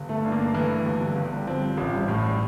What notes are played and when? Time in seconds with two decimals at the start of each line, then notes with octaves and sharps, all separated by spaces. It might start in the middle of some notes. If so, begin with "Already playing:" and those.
Already playing: G1
0.09 A3
0.25 G2
0.32 A#3
0.55 E3 A3
0.86 G1
1.01 G3
1.16 G1
1.36 G3
1.47 F3 C4
1.77 A1
1.93 G3
2.08 A2
2.28 G3